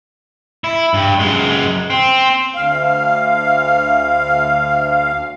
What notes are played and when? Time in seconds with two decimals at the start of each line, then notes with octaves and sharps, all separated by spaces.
0.64 E4
0.94 G2
1.19 F#2 G#3
1.90 C4
2.55 D2 F5